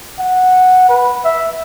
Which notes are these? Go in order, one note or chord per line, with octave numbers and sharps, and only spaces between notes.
F#5
B4
E5